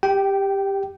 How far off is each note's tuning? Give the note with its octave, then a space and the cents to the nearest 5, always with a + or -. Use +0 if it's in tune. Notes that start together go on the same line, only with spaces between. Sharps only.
G4 +10 G5 -15